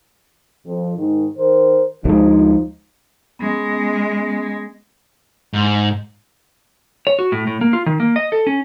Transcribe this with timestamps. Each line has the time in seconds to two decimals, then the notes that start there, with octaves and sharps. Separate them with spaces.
0.66 F2
0.97 G#2 D#3
1.37 D#3 A#4 C5
2.05 D2 F3 G#3 D#4
3.39 G#3 B3 C#4
5.54 G#2
7.07 C#5
7.19 F#4
7.32 A2
7.47 A2
7.61 A#3
7.73 F4
7.86 D#3
8.00 A#3
8.16 D#5
8.32 A4
8.47 C#4